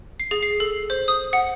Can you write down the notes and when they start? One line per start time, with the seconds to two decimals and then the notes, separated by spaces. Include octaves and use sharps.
0.20 C7
0.31 G#4
0.43 C7
0.60 A4
0.90 C5
1.08 D#6
1.33 F#5